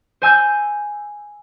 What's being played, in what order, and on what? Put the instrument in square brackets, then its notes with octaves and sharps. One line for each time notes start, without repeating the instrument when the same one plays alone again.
[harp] C5 G#5 E6 G6